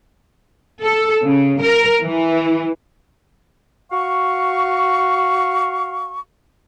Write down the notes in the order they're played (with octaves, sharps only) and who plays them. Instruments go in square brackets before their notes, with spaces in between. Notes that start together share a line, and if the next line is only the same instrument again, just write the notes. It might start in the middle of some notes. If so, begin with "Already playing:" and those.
[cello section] A4
C#3
A#4
E3
[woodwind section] F#4 F5 C#6